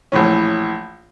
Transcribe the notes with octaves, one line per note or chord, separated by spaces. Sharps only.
A#1 A2 E3 C#4